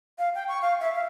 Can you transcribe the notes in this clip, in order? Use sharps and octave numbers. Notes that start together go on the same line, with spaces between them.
F5
G5
C#6
F5
E5
F5